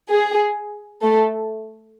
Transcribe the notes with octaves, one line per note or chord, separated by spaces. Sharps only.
G#4
A3 A4